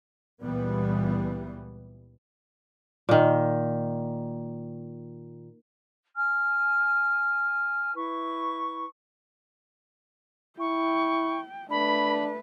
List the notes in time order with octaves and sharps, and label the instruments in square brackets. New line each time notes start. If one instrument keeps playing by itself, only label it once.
[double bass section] C#2 A#2 E3 G3 B3
[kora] A#2 D#3
[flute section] G#5 F6
E4 B4 C#6
[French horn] E4 [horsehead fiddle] G5 [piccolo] C#6
[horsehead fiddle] A3 B4 [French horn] D4 [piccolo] B5